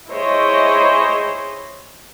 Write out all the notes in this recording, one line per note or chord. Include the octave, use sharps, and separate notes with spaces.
E4 G#4 C5 C#5 D#5